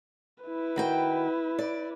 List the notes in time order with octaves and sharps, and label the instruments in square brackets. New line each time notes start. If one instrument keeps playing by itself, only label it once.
[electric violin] E4 B4
[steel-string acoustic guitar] D#3 F#4 G5
D5